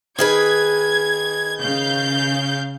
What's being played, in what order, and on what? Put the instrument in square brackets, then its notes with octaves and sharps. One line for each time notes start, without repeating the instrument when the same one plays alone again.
[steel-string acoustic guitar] D#3 G#4 B4 [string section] G#6
[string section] C#3 F5 G6